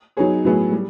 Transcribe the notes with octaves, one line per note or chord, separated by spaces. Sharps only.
F#3 B3 D#4 G#4 C#5
A2 F#3 B3 E4 G#4
G3